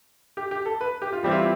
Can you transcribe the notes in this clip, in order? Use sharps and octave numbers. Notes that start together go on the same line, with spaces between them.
G4
G4
A4
B4
G4
F4
E3 G3 C4 E4 G4
F4
G4